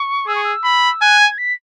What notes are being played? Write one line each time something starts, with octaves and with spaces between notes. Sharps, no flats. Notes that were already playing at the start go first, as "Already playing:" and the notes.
Already playing: C#6
G#4 E6
C#6
E6
B5
G#5 F#6
G#6
B6